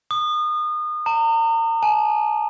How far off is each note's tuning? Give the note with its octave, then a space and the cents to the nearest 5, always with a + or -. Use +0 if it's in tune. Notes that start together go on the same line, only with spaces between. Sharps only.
D#6 -30
A#5 -40
G#5 +40